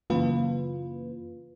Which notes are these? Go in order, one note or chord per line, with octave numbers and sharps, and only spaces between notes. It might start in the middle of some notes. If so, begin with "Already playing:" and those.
F#2 C#3 E3 A#3 F4 B4